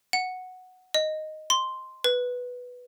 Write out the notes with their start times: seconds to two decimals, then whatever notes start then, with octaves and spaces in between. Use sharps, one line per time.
0.13 F#5
0.94 D#5
1.50 C6
2.04 B4